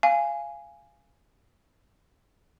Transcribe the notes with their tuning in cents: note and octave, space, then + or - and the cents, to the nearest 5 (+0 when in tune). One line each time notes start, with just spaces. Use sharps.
F5 -20 G#5 +0